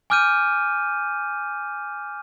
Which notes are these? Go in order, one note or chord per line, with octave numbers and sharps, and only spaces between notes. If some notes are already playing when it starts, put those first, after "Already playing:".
G#5 D6 F6 G6 D#7